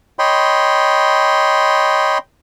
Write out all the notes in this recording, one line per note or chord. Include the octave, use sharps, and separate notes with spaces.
C#5 D#5 G5 B5 C6